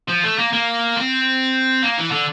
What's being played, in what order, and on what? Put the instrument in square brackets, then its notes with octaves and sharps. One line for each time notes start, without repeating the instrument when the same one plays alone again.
[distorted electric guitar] F3
A3
A#3
A#3
C4
A#3
E3
D3